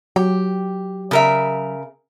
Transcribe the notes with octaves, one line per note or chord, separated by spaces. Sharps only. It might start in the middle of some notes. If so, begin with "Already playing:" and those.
F#3 G4
C#3 A#4 E5